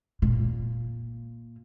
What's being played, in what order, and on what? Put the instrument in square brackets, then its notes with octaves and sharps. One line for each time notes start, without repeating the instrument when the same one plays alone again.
[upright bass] A#2